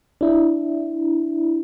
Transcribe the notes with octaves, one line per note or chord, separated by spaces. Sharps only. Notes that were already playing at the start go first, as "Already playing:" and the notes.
D4 E4